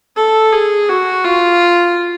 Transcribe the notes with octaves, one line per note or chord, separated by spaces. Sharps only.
A4
G#4
F#4
F4